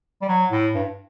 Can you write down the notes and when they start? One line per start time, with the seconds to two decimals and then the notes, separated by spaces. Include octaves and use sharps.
0.21 G3
0.28 F#3
0.50 A2
0.75 G2